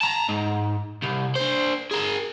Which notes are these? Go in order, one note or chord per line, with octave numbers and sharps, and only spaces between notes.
A5 A#5
G#2
C2
D4 C5
G#4 A#4